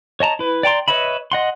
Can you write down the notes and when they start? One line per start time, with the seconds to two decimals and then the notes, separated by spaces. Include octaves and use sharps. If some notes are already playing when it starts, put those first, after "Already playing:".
0.20 C#5 D#5 A5 A#5
0.39 E4 B4
0.63 D5 G5 A#5 C6
0.88 B4 C#5 D#5 E5 B5
1.32 D#5 F#5 C6